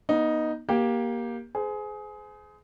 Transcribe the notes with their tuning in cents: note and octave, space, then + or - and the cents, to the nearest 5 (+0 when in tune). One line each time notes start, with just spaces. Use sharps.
B3 -35 D#4 +0
A#3 +15 G4 +0 G5 +0
G#4 +20 C5 -35